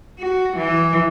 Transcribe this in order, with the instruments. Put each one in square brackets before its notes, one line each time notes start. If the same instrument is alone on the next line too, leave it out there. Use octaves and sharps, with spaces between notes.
[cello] F#4
E3